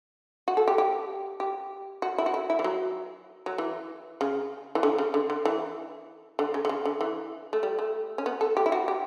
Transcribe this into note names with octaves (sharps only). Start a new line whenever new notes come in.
F#4
A4
G4
G4
G4
F#4
E4
F#4
E4
E4
E3
F#3
F#3
E3
C#3
E3
D3
C#3
D3
D3
E3
D3
C#3
D3
C#3
D3
E3
A3
G3
A3
C#4
B3
A4
G4
E4
F#4
G4